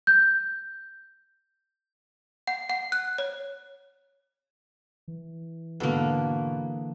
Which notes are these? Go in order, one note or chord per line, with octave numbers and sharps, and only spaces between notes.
G6
F#5
F#5
F#6
C#5
E3
G#2 B2 D3 A#3 B4